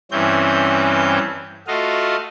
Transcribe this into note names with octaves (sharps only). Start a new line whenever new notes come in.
G2 E3 C4 C#4 G6
A3 F4 F#4 D#5 F5